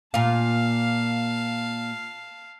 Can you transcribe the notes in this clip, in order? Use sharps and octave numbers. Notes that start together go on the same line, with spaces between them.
A#2 F4 F5 A5